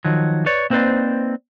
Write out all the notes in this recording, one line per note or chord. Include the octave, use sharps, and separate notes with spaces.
D#3 F3 F#3
B4 C#5 D5
A#3 C4 D#4 B4 C5 D5